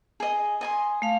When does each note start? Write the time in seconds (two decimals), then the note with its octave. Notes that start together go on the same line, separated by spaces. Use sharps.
0.20 G#4 D#5
0.61 D#5 G#5 C6
1.02 A3 F5